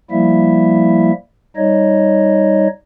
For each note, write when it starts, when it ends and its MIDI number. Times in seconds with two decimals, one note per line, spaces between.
0.11 1.12 53
0.11 1.12 55
0.11 1.12 58
0.11 1.12 64
0.11 1.12 76
1.56 2.68 55
1.56 2.68 63
1.56 2.68 73
1.56 2.68 75